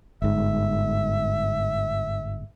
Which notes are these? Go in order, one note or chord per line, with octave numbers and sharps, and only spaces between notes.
G1 G#2 E5